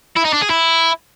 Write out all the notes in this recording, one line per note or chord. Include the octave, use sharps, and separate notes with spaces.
E4
D#4
D4
G#4
E4